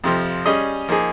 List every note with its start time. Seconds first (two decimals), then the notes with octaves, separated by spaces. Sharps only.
0.04 F2 C3 F3
0.46 G3 C#4 G#4 D#5
0.89 F3 A#3 D#4 G#4